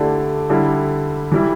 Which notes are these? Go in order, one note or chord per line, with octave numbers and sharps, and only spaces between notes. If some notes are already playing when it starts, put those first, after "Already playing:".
Already playing: D3 A3 E4 G4 D5
D3 G3 E4
E3 G3 E4